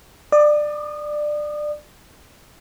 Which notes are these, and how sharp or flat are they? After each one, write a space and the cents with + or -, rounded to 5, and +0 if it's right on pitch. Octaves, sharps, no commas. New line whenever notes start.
D5 +20 D#6 -25